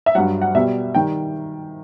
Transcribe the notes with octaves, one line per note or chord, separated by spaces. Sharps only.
E5
G2 F#3 F#5
F#5
B2 G3 E5
D#3 G3 G5